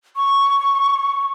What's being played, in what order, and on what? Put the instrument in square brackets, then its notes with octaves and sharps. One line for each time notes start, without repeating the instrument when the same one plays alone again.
[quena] C#6